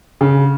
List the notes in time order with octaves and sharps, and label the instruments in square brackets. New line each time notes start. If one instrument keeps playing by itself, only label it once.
[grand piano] C#3